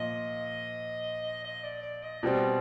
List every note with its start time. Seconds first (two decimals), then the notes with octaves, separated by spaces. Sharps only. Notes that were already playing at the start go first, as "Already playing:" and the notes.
Already playing: A#2 F3 D#5
1.44 D#5
1.64 D5
1.83 D5
2.03 D#5
2.23 B2 G3 C4 D5